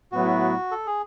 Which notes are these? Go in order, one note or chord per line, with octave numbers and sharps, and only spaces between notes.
A2 F#3 B3 E4 F#4
A4
G#4